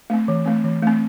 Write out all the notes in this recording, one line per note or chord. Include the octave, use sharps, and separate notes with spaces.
A3 C4
E3
A3 C4
E3
A3 C4